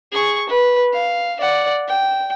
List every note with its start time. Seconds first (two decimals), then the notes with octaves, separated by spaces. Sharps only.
0.12 G#4 C#6
0.49 B4
0.93 F5
1.40 D5 F#5
1.87 G5